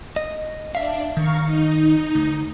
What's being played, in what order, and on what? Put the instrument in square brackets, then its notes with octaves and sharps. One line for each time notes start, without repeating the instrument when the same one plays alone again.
[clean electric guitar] D#5
[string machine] D4 [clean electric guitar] E5 F5
[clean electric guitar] D#3 [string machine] F5 A#5 C#6
[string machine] D#4
[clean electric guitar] D2